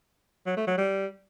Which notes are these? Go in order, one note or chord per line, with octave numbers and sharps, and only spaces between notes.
F#3
A3
F#3
G3